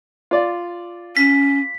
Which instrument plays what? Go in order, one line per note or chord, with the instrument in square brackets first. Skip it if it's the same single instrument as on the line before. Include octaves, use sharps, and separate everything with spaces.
[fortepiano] F4 D5
[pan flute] C#4 [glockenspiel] B6